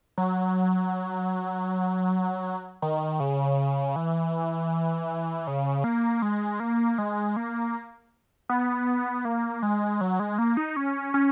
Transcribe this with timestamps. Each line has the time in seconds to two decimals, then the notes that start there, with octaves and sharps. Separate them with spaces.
0.18 F#3
2.82 D#3
3.20 C#3
3.96 E3
5.47 C#3
5.84 A#3
6.22 G#3
6.60 A#3
6.98 G#3
7.36 A#3
8.49 B3
9.25 A#3
9.63 G#3
10.01 F#3
10.20 G#3
10.38 A#3
10.57 D#4
10.76 C#4
11.14 C#4